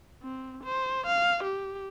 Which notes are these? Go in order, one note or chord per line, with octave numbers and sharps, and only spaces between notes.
C4
C5
F5
G4